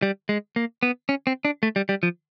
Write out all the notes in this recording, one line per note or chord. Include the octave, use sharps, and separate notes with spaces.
G3
G#3
A#3
B3
C#4
C4
D4
A3
G3
G3
F3